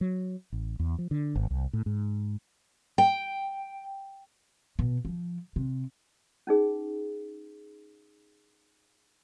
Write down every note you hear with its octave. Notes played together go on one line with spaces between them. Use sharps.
F#3
A1
E2
F3
D3
G#1
C2
A2
G#2
G5
B2
F3
C3
C#4 D#4 G#4